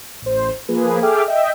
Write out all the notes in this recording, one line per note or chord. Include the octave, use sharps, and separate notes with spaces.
A1 C5
F3 A#3 G#4 B4
G#4 A4 E5 G5 D6 F6
D#5 E5 G5